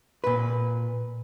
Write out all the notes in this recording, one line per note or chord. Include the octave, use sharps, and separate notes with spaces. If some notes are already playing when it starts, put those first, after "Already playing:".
A#2 B4